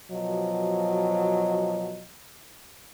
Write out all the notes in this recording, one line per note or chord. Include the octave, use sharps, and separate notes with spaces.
B2 F3 F#3 D#5